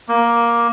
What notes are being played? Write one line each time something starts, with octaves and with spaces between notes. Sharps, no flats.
A#3